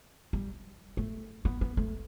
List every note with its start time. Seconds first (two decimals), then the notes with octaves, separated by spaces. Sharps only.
0.33 G3
0.97 A3
1.45 B3
1.61 B3
1.77 A3